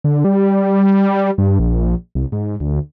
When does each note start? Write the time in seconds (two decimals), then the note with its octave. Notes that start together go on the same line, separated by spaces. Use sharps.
0.04 D3
0.24 G3
1.38 G2
1.59 A#1
2.15 C2
2.32 G#2
2.60 D2